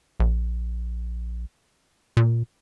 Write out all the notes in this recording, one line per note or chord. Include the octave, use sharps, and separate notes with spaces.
A#1
A#2